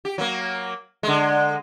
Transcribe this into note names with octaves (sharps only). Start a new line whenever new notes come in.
G4
F#3 A#3
D3 G#3